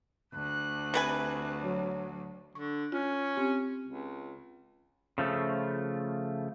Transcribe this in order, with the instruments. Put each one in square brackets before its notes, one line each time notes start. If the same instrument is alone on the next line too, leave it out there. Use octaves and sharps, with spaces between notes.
[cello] D2 [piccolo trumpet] F#6
[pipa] C3 B4 G#5
[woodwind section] F#3
[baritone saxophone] D3 [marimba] C#6
[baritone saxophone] C#4 [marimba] F4
[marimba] C4 G4
[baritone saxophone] C#2
[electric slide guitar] C#3 F3 A3